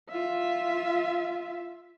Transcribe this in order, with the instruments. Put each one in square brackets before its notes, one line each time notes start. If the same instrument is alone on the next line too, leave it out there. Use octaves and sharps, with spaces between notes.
[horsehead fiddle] F4 E5